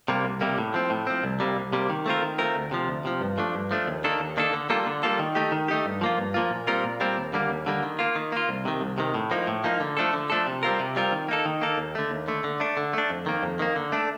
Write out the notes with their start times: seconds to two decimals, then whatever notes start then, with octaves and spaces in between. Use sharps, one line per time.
0.08 C3 G3 A#3
0.25 C2
0.41 C3 G3 A#3
0.58 A2
0.74 F3 C4
0.90 A2
1.07 F3 C4
1.23 C2
1.40 C3 G3 A#3
1.56 C2
1.73 C3 G3 A#3
1.89 D#3
2.06 A3 C4 F4 A#4
2.23 D#3
2.38 A3 C4 F4 A#4
2.56 D2
2.71 C3 F3
2.88 D2
3.05 C3 F3
3.21 G2
3.38 F3 A3 D4
3.55 G2
3.71 F3 A3 D4
3.87 D#2
4.04 D#3 A#3 D4 A4
4.20 D#2
4.37 D#3 A#3 D4 A4
4.53 D3
4.70 G3 A#3 F4 A4
4.86 D3
5.03 G3 A#3 F4 A4
5.19 D#3
5.35 A3 D#4 G4
5.52 D#3
5.68 A3 D#4 G4
5.85 G2
6.01 F3 A#3 F4
6.18 G2
6.34 F3 A#3 F4
6.51 A#2
6.67 G3 C4 F4 A#4
6.84 A#2
7.00 G3 C4 F4 A#4
7.17 D#2
7.33 D3 G3 A#3
7.50 D#2
7.66 D3 G3 A#3
7.83 D#3
7.99 A#3 F4
8.16 D#3
8.32 A#3 F4
8.49 C2
8.65 C3 D#3
8.81 C2
8.98 C3 D#3
9.14 A2
9.31 F3 A#3 D#4
9.47 A2
9.64 F3 A#3 D#4
9.80 D3
9.97 F3 A3 D4 A4
10.13 D3
10.30 F3 A3 D4 A4
10.47 C3
10.63 G3 C4 F4 A#4
10.79 C3
10.96 G3 C4 F4 A#4
11.12 D#3
11.29 A#3 D#4 A4
11.46 D#3
11.61 A#3 D#4 A4
11.78 D#2
11.95 D3 A3
12.11 D#2
12.28 D3 A3
12.44 D3
12.60 A3 D4
12.77 D3
12.93 A3 D4
13.10 F2
13.26 D#3 A#3
13.43 F2
13.59 D#3 A#3
13.76 D3
13.92 A3 D4